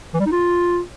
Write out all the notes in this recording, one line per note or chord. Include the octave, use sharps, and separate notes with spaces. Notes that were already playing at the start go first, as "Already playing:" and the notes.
E3
G3
D#4
F4